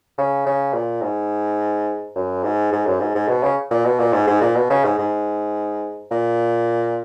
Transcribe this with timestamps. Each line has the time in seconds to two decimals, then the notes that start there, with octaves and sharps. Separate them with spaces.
0.18 C#3
0.46 C#3
0.74 A#2
1.02 G#2
2.15 F#2
2.44 G#2
2.72 G#2
2.86 F#2
3.00 G#2
3.15 G#2
3.28 B2
3.43 C#3
3.71 A#2
3.85 B2
3.99 A#2
4.13 G#2
4.27 G#2
4.41 A#2
4.55 B2
4.70 C#3
4.84 G#2
4.98 G#2
6.11 A#2